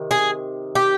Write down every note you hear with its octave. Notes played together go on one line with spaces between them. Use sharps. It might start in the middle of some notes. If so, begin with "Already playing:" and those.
Already playing: C3 D#3
G#4
G4